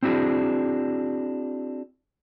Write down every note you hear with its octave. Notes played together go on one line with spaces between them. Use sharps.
C4 D4 E4 F#4 G#4